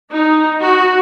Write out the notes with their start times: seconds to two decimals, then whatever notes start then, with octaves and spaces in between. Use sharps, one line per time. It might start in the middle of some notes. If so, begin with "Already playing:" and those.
0.12 D#4
0.61 F#4